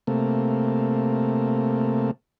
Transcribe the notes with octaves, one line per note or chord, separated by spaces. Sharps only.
C3 A3 A#3